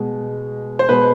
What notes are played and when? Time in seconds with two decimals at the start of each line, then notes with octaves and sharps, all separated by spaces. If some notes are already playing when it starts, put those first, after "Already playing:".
Already playing: B2 G#3
0.79 C5
0.89 B2 G#3 B4